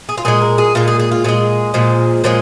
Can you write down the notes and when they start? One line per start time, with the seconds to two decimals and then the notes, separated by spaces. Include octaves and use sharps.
0.09 G#4
0.18 F4
0.25 A#2 G#3 G#4
0.42 A#4
0.58 G#4
0.75 A#2 G#3 F4
0.88 G#4
0.99 G#4
1.11 F4
1.24 A#2 G#3 G#4
1.74 A#2 F3 G#3
2.24 A#2 F3 G#3 G#4